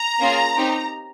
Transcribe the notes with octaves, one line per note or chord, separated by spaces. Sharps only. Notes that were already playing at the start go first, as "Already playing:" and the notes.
Already playing: A#5
A#3 C#4 F4 G#4
C4 D#4 G4